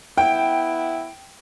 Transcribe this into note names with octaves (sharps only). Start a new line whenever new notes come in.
B3 E4 G5